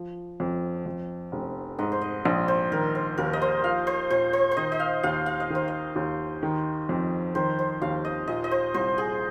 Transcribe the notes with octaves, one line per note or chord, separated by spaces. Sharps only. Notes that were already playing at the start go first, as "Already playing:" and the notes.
Already playing: F3
F2
F2
F1
G#2 D#5
C5
D#5
A#1 D#5
C5
D#3 A#4
C5
D#2 A#4
D#5
C5
F3 F5
C5
A#2 C5
C5
C5
D#3 D#5
D#5
F5
D#2 F5
F5
D#5
D#3 C5
D#5
D#2
D#3
F2
D#3 C5
C5
D#2 F5
D#5
A#2 D#5
D#5
C5
C2 C5
G#4